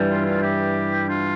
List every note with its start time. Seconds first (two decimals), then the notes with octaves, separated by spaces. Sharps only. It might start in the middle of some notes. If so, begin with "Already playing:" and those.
Already playing: G2 E3 G3
0.10 D4 F4
0.25 D4 F4
0.42 E4 G4
1.07 D4 F4